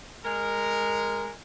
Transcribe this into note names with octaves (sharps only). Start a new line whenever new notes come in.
G#3 A#4